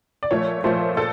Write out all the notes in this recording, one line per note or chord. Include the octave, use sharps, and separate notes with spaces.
D5
A#2 F3 A3 C#5
A#2 F3 A3 C5
A#2 A4